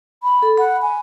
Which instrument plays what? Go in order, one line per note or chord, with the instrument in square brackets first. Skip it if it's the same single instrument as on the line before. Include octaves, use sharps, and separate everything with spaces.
[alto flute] B5
[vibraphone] A4
[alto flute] F#5 [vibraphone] B5
[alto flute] G#5